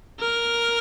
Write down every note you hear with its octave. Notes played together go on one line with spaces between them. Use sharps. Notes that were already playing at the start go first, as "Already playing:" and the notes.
A#4